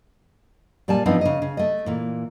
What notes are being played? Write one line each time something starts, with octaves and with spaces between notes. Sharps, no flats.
A#2 G3 D5 G#5 A5
G#2 F3 B3 C4 D4 D#4
C#3 D#5
C#3
A3 D#5
A#2 E3